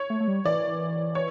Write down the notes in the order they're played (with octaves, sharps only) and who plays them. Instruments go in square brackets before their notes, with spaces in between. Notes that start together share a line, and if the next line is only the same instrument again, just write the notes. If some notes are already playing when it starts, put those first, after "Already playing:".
Already playing: [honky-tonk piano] C#5
[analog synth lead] A3
A3
G3
[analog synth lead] E3 [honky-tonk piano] D5
[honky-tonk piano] C#5